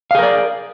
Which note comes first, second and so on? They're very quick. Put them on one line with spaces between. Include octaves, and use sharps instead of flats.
F5 G#4 A#4 D5